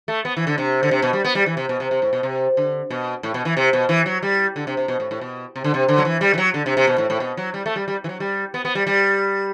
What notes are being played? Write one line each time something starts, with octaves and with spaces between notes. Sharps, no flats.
A3
B3
E3
D3
C3
D3
C3
B2
G3
B3
G3
E3
C3
B2
C3
C3
A2
B2
C3
D3
B2
A2
B2
E3
C3
B2
E3
F#3
G3
D3
C3
C3
B2
A2
A2
B2
C3
D3
C3
D3
F#3
E3
G3
E3
F#3
D3
C3
C3
B2
A2
A2
B2
F#3
G3
A3
G3
G3
E3
F#3
G3
B3
B3
G3
G3